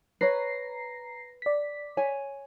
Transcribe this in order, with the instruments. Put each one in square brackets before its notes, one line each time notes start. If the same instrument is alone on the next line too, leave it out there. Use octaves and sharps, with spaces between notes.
[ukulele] B4 C#5 [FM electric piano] A#5 A#6 C7
[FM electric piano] D5 B6
[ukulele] C#5 G#5